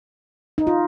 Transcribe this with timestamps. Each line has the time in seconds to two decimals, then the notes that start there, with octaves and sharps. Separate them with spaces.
0.58 D#4
0.67 F4